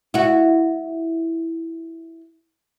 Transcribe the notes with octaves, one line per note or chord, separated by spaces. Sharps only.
E4 F#4